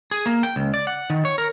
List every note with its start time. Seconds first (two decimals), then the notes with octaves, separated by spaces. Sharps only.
0.11 G#4
0.26 A#3
0.43 G5
0.56 C#2
0.74 D5
0.87 F#5
1.10 D#3
1.25 C#5
1.38 A#4